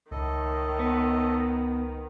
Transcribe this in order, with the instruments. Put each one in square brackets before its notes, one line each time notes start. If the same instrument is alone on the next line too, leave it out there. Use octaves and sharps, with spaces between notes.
[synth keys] C#2 [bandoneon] A2 A4 D#5 [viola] D#3
[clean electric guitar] B3